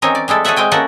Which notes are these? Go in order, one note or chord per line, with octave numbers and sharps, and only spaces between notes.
E3 C4 C#4 D#4 A#4 C#5
D5
G3 G#3 E4 A4
F#4 G#4 A4 C#5 E5 F#5
G#3 C4 G5 G#5
A#3 C#4 F#4 A4 A#4 F#5